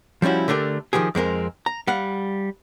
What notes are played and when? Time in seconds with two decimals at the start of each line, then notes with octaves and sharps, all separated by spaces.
0.22 F3 G3 C#4 E4 F#4
0.48 D3 A3 D4 G4 A#4
0.93 D#3 F3 F#3 G4 G#4
1.15 F2 G#3 C4 A#4
1.66 A#5
1.87 G3 F5 F#5